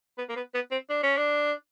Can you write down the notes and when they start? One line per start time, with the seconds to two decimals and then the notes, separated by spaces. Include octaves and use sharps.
0.18 B3
0.29 A#3
0.36 B3
0.55 B3
0.71 C4
0.90 D4
1.03 C#4
1.17 D4